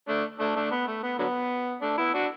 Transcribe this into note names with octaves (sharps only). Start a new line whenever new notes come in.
A3 D4
A3 D4
A3 D4
B3
A3
B3
D3 F#3 B3
A3 D4
B3 E4
D4 F#4